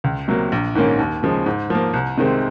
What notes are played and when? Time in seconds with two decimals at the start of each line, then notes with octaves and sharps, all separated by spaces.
0.04 C#2
0.28 C3 F#3 A#3
0.52 A#1
0.75 G#2 D#3 A#3 C#4
0.99 D#2
1.23 C#3 F3 G#3
1.46 G#2
1.70 F3 A#3
1.94 C2
2.17 C3 D#3 G#3 C4